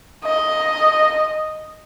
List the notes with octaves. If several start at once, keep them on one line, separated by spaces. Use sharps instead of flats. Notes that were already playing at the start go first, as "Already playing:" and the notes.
D#5